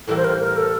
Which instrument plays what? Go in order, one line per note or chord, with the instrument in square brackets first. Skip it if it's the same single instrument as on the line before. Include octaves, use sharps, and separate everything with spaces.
[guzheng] A2 E3 G3 A#3 [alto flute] A4
[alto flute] C5
A#4
A#4
A4